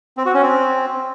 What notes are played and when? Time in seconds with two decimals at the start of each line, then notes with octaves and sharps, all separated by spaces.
0.17 C4
0.26 F#4
0.34 C#4
0.43 C4